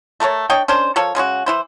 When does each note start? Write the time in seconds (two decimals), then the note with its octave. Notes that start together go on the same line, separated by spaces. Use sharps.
0.20 A3 A4 A#4 C#5
0.50 D4 C#5 D#5 G5
0.68 C#4 D4 A#4 C5
0.96 F3 A4 A#4 C#5
1.15 C#3 G#3 C#4 F#4
1.46 E3 E4 C5